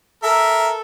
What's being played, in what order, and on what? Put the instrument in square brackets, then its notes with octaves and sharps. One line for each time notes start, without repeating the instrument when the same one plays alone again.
[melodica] A4 [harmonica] A#4 E5